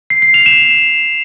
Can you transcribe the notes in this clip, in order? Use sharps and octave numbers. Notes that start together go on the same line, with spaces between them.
C7
C7
F7
E7